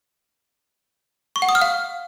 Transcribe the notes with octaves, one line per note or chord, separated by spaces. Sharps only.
C#6
F#5
D#6
F6
F5